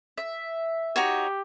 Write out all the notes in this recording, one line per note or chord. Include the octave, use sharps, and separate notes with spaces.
E5
D#4 F#4 G4 C#5